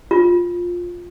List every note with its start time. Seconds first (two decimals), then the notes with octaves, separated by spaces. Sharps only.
0.11 F4